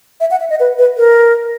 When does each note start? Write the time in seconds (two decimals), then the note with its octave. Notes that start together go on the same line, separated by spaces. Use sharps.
0.20 E5
0.31 F#5
0.40 E5
0.50 D#5
0.60 B4
0.78 B4
0.98 A#4